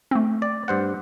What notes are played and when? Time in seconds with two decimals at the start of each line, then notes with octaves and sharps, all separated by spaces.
0.11 A3 C4
0.42 D5
0.68 G2 C5 F#5